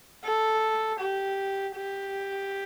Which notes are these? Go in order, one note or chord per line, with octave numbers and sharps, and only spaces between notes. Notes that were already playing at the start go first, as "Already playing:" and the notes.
A4
G4
G4